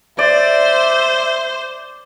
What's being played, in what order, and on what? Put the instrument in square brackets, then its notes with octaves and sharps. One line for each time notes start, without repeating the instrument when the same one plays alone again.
[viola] C5 [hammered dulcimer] D5 [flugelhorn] E5